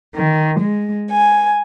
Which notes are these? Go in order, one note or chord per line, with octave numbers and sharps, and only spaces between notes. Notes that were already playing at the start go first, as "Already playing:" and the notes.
D#3
G#3
G#5